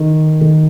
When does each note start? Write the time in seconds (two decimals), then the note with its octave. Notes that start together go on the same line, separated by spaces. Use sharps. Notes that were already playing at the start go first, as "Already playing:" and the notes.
Already playing: D#3
0.41 D#3